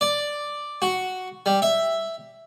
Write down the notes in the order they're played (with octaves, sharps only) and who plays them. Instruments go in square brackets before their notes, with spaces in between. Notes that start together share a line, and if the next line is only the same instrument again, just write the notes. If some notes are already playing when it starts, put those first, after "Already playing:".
[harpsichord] D5
F#4
G3
E5